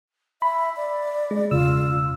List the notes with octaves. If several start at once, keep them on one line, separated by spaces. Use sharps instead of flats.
E5 B5
D5
G#3
E1 C#3 F4 E6